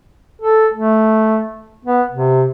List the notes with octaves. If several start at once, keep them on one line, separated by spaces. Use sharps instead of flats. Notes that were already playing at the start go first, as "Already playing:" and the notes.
A4
A3
B3
C3